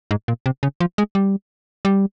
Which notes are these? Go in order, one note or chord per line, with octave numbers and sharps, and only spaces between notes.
G#2
A#2
C3
C#3
F3
G#3
G3
G3